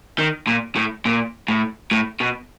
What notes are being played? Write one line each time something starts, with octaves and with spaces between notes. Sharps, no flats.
D#3
A#2
A2
A#2
A2
A2
B2